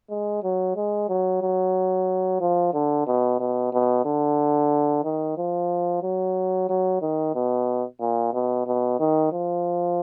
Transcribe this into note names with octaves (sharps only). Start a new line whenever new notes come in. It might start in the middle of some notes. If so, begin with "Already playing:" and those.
G#3
F#3
G#3
F#3
F#3
F3
D3
B2
B2
B2
D3
D#3
F3
F#3
F#3
D#3
B2
A#2
B2
B2
D#3
F3